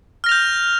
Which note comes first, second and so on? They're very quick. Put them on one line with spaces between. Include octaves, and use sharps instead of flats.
F6 A#6 F7 G6